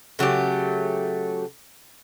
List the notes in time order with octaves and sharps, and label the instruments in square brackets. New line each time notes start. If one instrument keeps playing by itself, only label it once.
[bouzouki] C#3 F#3 A3 G4